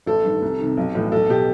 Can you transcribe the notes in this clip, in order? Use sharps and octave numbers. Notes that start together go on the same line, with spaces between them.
A1 A4
G2 D#3
C2
C3 D#3
B1
A2 E3
B1 A4
B2 G4